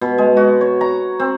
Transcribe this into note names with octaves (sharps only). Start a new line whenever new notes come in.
B2
G#3
F#4
C#5
A#5
C4